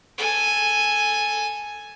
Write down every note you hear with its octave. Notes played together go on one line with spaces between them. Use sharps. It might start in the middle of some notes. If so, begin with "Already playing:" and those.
A4 G#5